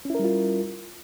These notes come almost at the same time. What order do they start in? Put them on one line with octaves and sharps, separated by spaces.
C#4 E4 A#4 G3 F4